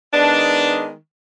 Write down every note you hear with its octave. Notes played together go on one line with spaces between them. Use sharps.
D#3 G#3 B3 D4